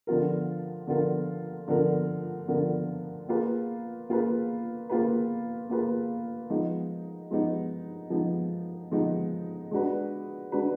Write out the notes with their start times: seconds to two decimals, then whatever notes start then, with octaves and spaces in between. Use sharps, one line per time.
0.07 D3 F3 B3 F4 A#4
0.87 D3 F3 B3 F4 A#4
1.68 D3 F3 B3 F4 A#4
2.48 D3 F3 B3 F4 A#4
3.29 A#3 F4 G#4 B4
4.09 A#3 F4 G#4 B4
4.90 A#3 F4 G#4 B4
5.69 A#3 F4 G#4 B4
6.50 F3 G#3 B3 D#4
7.31 F3 G#3 B3 D#4
8.10 F3 G#3 B3 D#4
8.92 F3 G#3 B3 D#4
9.71 G#3 D4 F#4 B4
10.52 G#3 D4 F#4 B4